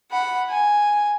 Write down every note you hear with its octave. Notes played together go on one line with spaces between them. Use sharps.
F#5 B5
G#5